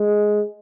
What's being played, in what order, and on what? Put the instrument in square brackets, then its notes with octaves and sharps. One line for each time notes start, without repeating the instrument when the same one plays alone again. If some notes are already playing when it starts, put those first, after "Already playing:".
Already playing: [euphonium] G#3